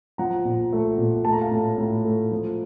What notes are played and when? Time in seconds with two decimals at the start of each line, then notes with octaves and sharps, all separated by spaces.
0.18 F3 F#5 A#5
0.45 A#2
0.73 A3
0.98 A#2
1.25 A3 A5
1.33 A#5
1.41 F5 A5
1.51 A2
1.78 A2
2.04 A3
2.32 F3